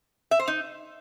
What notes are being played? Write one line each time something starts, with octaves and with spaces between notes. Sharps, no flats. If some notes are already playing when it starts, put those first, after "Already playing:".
E5
C5
D#4